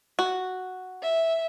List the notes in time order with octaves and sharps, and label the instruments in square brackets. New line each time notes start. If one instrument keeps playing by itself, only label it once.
[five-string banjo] F#4
[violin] E5